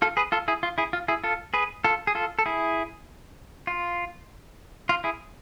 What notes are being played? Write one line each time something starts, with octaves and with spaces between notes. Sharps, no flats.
F4 A4
G#4 B4
F4 A4
E4 G#4
F4
E4 G#4
F4
E4 G#4
F4 A4
G#4 B4
F4 A4
G#4
F4 A4
A4
E4 G#4
F4
F4
E4 G#4